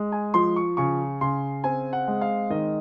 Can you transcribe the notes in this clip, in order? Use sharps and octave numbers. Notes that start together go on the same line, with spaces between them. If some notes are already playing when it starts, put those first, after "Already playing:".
Already playing: G#3
G#5
F3 C6
C#6
C#3 C#6
C#3 C6
C4 G#5
F#5
G#3
F5
D#3 D#5